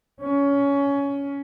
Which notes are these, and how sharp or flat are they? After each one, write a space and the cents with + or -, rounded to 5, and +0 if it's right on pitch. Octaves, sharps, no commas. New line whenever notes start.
C#4 +20